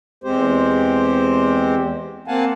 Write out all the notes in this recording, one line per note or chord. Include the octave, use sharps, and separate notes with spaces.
E2 G#3 C4 G4 C5
A#3 C4 F5 F#5 G#5 A5